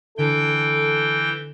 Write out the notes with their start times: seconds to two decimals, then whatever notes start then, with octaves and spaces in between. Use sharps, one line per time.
0.18 D3 E3 A4 G5
1.17 A#6